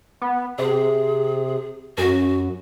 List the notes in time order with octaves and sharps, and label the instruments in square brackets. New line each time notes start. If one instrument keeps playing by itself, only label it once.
[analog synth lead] B3
[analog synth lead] C3 [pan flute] G#4
[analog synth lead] F#2 [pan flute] F#4